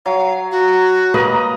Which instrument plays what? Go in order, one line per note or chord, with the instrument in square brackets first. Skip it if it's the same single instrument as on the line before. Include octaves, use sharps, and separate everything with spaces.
[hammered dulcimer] F#3 [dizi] F5
[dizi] F#4
[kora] A#3 G4 B4 [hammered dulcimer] D#5 A#5